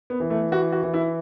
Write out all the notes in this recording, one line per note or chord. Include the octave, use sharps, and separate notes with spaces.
B3
E3
A3
E3 F#4
F#4
E3
E4